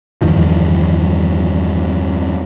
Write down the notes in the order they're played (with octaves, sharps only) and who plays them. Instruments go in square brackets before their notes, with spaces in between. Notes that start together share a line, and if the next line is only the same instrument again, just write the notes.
[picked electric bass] E2 G2 D#3 F3